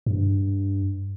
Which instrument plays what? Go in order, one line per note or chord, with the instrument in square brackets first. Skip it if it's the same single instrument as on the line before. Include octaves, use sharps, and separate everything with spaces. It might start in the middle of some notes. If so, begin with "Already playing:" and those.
[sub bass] G2